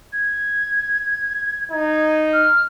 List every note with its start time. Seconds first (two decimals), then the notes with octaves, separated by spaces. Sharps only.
0.12 G#6
1.71 D#4 G#6
2.33 F6